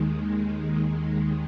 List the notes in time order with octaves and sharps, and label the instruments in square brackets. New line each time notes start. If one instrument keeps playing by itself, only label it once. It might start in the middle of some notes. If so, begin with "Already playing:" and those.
Already playing: [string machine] D#2 D#3 G#3